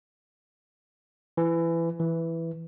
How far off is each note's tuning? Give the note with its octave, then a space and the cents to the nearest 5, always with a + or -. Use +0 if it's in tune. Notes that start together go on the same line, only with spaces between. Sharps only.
E3 +20
E3 +5